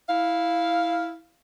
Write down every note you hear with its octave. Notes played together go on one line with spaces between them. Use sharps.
E4 F5